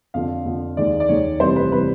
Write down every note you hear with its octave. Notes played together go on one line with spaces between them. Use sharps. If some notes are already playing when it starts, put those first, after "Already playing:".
F2 D3 F3 F5
F2 D3 F3
D#2 D#3 G#3 D5
D5
D#2 D#3 G#3 C#5
F1 F2 C3 E3 G3 C5
B4
C3 E3 G3 B4